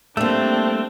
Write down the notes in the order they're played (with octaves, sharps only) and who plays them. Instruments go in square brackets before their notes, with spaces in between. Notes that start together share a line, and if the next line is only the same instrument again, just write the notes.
[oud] G3 A#3 [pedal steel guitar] A3 [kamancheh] C4 D4